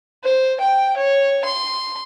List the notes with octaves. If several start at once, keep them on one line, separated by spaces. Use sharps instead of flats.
C5
G5
C#5
C6